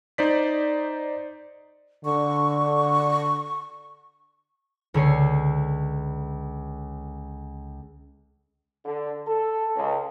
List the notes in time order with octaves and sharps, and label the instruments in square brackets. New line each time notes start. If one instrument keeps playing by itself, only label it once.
[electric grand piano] D#4 C5 D5 B6
[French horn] D3 [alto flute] C#6
[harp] C#2 D3 C#5 C7
[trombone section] D3
A4
C#2